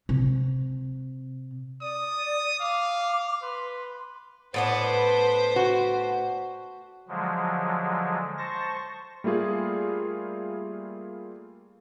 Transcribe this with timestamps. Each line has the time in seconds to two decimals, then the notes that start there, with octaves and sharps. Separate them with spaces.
0.09 C3
1.81 D5 D#6
2.60 F5 D6
3.42 B4 C6
4.54 A2 B3 D4 B4 C5
5.56 F#4
7.09 D3 F3 F#3 G#3
8.38 C5 A5 C#6 A#6
9.24 G3 A3 A#3 F4 G#4